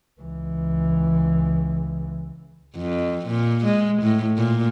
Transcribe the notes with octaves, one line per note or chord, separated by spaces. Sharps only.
C#2 E3
F2
A#2
G#3
A2
A#2